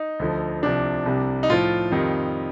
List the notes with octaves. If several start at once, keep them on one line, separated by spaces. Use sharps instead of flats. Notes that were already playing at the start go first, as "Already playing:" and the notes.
Already playing: D#4
D2 D3 F3
C2 C3 F3 D4
C2 C3 G3
D#4
A2 F3 F4
F2 D#3 G3